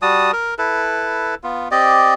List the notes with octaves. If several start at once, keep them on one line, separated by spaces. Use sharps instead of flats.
G3 F#4 A5 D#6
A#4
E4 A4 B4
B3 F4
C4 G4 D5 D#5